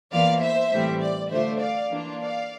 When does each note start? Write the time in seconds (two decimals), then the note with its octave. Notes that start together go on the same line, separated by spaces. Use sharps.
0.12 E2 E3 A#3 F4 D5 F5
0.41 C5 E5
0.72 A2 E3 G3 C4
1.01 D5
1.30 D3 A3 D4 F4 C5 E5
1.60 D5 F5
1.89 E3 A#3 D4 F4
2.20 D5 F5